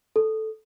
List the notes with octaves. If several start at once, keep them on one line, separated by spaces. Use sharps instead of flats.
A4